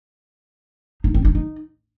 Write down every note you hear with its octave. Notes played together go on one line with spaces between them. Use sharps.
D#4
C4
D#4
D#4